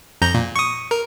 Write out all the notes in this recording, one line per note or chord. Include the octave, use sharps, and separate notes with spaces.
F2 A#5 G6
A#2
C#6 D#6
A#4